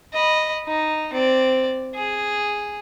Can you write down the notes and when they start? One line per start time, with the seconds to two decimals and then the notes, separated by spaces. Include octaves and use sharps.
0.13 D#5 B5
0.67 D#4
1.13 C4 D5
1.95 G#4